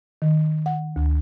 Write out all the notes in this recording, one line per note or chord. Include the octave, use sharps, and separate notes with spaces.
D#3
F#5
D2